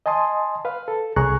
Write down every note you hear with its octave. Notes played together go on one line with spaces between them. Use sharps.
D#5 G#5 A5 C6 D#6
B4 F5
A4
C2 G#4 A#5 C#6 F#6